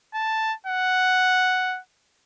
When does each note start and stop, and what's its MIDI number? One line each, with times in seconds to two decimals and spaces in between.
0.15 0.53 81
0.67 1.79 78